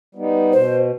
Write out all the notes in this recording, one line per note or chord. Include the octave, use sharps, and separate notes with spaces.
G3 B3 D#4
B2 C5